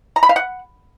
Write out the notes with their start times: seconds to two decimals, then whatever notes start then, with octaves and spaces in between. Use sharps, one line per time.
0.16 A#5
0.23 B5
0.29 F5
0.36 F#5